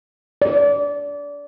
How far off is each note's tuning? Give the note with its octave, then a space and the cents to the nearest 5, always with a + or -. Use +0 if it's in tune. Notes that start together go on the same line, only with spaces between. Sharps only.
D5 -25